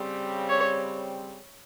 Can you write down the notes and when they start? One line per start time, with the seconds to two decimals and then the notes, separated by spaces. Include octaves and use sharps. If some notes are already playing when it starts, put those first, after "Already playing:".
Already playing: C#3 G3 C4
0.49 C#5